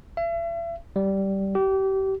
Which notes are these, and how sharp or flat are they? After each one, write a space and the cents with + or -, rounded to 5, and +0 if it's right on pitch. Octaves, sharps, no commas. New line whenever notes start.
E5 +40
G3 -10
G4 -30